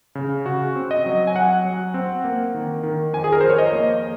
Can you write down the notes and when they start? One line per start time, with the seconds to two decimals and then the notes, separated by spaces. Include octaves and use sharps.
0.15 C#3
0.46 C#3 F#4
0.75 C4
0.91 D#5
1.06 F#3
1.27 G#5
1.35 F#3 F#5
1.65 F#3
1.94 C4
2.24 A#3
2.54 D#3
2.83 D#3
3.13 F2 G#5
3.24 G#4
3.33 A#4
3.41 F2 C5
3.50 C#5
3.58 D#5
3.73 A#3